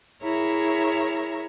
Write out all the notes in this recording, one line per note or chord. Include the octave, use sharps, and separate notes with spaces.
E4 G#4 A#4 C#5 E5 A#5